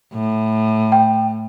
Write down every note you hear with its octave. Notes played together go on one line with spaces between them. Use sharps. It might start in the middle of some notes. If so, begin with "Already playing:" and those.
A2
G5